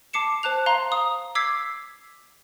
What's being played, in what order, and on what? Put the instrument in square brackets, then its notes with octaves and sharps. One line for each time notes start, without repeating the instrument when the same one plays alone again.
[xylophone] A5 D6 C7 C#7 E7
C5 A5 F#6 F7
F5 A#5 C6
D#6
D6 E6 G#6 B6 C7